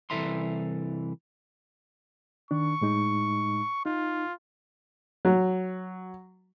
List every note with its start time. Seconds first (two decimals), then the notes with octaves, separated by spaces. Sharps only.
0.10 C2 E3 A4 E5 A#5 C6
2.51 D#3 D4 C#6
2.81 A2 G#3 D#4
3.86 D#4 F4
5.25 F#3